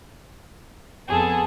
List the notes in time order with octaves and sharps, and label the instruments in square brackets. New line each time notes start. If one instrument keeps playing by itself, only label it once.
[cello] F2 B3 [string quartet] G#4 A4